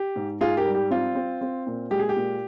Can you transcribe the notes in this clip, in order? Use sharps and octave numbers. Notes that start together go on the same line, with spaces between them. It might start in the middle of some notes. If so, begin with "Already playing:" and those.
Already playing: G4
G#2
G#2 F4 G#4
G4 A#4
G3
G4
C4 F4
C4
C4
A#2
G#3 G4
G#4
G4
A#2